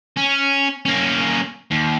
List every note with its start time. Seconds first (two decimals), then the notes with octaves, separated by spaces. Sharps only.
0.17 C#4
0.85 A#3 C#4
1.71 D#2